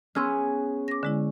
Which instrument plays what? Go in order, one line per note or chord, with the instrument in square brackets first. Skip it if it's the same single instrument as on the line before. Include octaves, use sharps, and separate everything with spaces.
[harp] B3 C#4 G#4 [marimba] C6 E6 F6
[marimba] D6 A#6
D3 G#3 E4